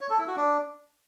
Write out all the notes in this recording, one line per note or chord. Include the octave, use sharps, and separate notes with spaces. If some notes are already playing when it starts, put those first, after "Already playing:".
C#5
A4
E4
F#4
D4